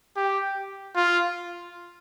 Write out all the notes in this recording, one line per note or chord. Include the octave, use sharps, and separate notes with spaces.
G4
F4